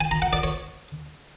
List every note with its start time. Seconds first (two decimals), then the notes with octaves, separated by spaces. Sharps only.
0.01 G#5
0.11 A#5
0.22 F#5
0.33 D5
0.43 C#5